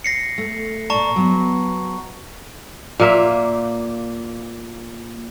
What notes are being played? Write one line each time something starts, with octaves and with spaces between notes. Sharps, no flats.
A#6 C7 C#7
A3
A#2 D5 A5 A#5 C#6
F#3 B3
A#2 A#3 E5